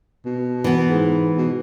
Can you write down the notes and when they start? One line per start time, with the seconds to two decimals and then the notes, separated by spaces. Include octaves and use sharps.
0.25 B2
0.64 E3 B3
0.89 G#2
1.38 B2